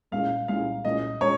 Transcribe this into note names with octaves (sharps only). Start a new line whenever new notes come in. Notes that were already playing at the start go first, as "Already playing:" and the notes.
C2 A#2 G#3 C#4 F5
C2 A#2 G#3 C#4 F5
C2 A#2 G#3 C#4 D#5
A#2 G#3 C#4 C#5